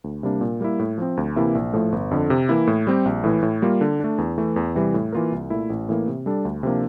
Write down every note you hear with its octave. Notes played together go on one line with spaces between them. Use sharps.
D2
C3 G3 A#3 D4
A#2
G3 A#3 E4
A2
F3 C4
D2
C3 E3 A#3 E4
A#1
A2 F3 A3
G1
F2 D3
C3
E3 A#3 E4
A2
G3 C4 G4
A#1
A2 E3
A2
G3 A#3 F4
D3
A3 D4
E2
E3 A3
E2
C3 E3 G3
A2
E3 A#3 F4 A#4
C2
A#2 A3 E4
A1
A2 E3 A#3
C3
G3 D4 A4
D2
C3 F3 A#3 D4